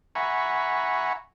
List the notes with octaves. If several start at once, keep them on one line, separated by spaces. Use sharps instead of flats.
E5 F#5 G#5 A#5 B5 C#6